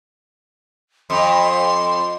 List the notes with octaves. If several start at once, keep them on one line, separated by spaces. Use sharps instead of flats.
F2 C6